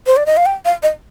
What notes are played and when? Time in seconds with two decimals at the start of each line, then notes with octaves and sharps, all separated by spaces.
0.07 C5
0.17 D5
0.26 D#5
0.37 F5
0.46 G5
0.65 F5
0.83 D#5